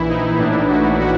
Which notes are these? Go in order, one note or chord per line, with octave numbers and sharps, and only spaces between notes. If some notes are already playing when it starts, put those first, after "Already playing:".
Already playing: A#1 E3 E4
D#4
A2 D4
F#4
E3
F#4